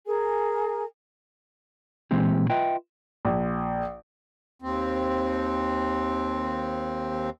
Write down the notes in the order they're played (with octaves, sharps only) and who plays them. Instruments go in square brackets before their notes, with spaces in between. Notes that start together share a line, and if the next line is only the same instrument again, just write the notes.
[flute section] G#4 A#4 G#5
[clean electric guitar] A#2 E3 G#3 C4 G4
F4 B4 D#5 E5 G5
[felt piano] A#1
[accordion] D#2 C4